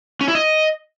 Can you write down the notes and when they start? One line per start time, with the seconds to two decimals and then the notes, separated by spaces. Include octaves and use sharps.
0.21 C#4
0.28 E4
0.35 D#5